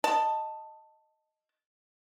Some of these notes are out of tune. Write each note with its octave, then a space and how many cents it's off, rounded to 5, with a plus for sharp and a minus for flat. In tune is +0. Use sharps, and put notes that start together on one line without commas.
D#5 +0 A5 +10